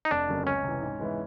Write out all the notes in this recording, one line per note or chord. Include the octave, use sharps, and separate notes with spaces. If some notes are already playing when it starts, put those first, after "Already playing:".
D#4
F1 D4
F2 C#3 F#3 A#3
C#2 C#4
C3 E3
G#2
E3 G#3 B3 E4